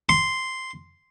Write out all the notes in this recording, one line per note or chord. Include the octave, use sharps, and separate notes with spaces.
C6